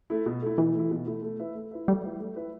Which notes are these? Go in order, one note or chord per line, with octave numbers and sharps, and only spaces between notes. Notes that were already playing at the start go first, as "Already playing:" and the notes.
A3 E4
B2
A3 E4
B2 E3
A3 E4
B2
A3 E4
A3
E4 B4 E5
A3
E4 B4 E5
G3 A3
E4 B4 E5
A3
E4 B4 E5